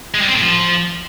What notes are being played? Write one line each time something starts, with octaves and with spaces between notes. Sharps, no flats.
G#3
G3
C4
A2
F3